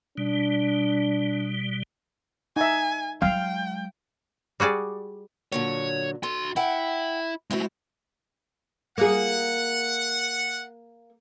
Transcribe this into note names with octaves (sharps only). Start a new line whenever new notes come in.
B2 G3 D4
D#4 E5 G#5
F#3 G#3 F5 G5
G3 F#4 G#4 D5
A#2 D3 F#3 C#5
F#4 A4 C6
E4 F#5 G5
G#3 A3 C4 E4 F#4
A#3 G#4 F#5